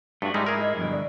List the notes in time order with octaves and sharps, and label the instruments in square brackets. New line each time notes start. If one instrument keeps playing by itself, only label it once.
[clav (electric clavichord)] G2 [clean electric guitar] A3 F#4
[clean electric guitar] G#2 E4 [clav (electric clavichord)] G3 G#3 D#4
[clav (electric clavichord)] G#4 A#4
[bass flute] D#5
[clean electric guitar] G2 B2 D3 [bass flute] F3
[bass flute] D5